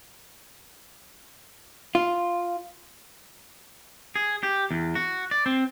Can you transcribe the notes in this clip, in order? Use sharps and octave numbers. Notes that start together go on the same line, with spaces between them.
F4
G#4
G4
E2
F#4
D5
C4